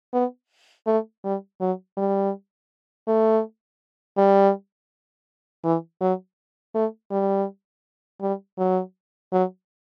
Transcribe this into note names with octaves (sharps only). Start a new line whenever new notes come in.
B3
A3
G3
F#3
G3
A3
G3
E3
F#3
A3
G3
G3
F#3
F#3